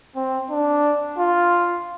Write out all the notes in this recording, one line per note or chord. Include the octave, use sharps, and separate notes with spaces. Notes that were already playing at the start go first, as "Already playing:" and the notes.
C4
D4
F4